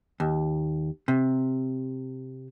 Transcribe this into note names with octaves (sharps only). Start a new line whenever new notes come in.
D#2
C3